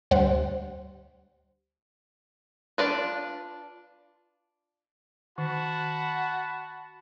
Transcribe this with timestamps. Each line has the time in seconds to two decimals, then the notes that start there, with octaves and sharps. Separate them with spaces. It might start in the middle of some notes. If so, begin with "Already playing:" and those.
0.11 D2 G3 C5 F#5
2.78 D4 F4 B4
5.38 D#3 F#4 A5 B5